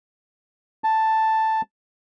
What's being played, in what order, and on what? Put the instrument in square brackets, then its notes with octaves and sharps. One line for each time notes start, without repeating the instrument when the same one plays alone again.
[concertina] A5